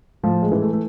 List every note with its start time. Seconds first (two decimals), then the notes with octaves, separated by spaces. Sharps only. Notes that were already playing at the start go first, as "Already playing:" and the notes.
0.23 A2 F3
0.43 G#3
0.52 E3
0.62 A3
0.73 A3